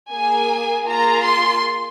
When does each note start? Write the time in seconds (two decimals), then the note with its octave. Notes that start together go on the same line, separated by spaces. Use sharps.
0.11 A#3 G#4 G#5
0.86 A#3 F4 G#4 A#5
1.25 C6